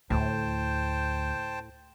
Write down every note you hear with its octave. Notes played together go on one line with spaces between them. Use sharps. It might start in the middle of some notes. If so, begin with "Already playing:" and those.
D2 A2 C5 G5 A5